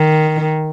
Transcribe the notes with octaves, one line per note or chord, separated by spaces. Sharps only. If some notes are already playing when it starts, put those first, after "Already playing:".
Already playing: D#3